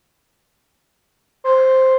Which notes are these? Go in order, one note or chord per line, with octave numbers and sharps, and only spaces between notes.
C5